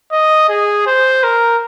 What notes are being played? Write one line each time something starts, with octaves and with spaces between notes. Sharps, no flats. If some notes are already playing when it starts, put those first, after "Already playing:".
D#5
G#4
C5
A#4